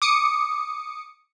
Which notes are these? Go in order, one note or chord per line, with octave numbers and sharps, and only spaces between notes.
D6 D#6 C#7